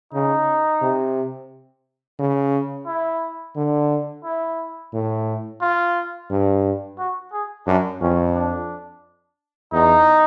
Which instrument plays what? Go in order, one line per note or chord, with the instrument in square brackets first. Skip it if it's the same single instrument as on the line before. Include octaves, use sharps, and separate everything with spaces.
[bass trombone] C#3 [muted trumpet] D#4
[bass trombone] C3
C#3
[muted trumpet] E4
[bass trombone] D3
[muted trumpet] E4
[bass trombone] A2
[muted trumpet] F4
[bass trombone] G2
[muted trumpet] F#4
G#4
[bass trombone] F#2 [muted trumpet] D4
[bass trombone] F2 [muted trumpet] C#4
[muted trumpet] D4
[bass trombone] E2 [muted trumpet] D#4